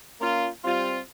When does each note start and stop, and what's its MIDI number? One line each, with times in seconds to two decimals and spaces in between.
0.21 0.48 58
0.21 0.48 61
0.21 0.48 65
0.64 1.00 55
0.64 1.00 60
0.64 1.00 65